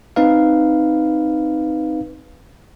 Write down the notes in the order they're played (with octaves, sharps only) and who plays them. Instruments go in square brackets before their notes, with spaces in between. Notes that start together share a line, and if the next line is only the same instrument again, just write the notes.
[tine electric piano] C4 D#4 B4 F5